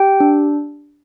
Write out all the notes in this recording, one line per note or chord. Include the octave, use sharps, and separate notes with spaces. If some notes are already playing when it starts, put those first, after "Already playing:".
Already playing: G4 G5
D4